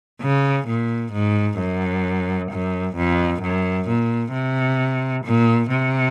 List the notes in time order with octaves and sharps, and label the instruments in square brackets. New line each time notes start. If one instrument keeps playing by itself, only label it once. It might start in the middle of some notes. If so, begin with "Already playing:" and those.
[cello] C#3
A#2
G#2
F#2
F#2
F2
F#2
A#2
C3
A#2
C3